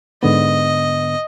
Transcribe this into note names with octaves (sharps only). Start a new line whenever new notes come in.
G#2 D3 B3 D#5